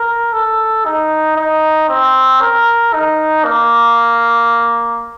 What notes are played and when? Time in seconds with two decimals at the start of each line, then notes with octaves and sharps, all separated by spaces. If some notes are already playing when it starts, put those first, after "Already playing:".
Already playing: A#4
0.33 A4
0.85 D#4
1.36 D#4
1.89 C4
2.41 A#4
2.94 D#4
3.45 A#3